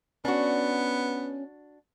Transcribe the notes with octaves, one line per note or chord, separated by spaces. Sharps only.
B3 C#4 D4 F#4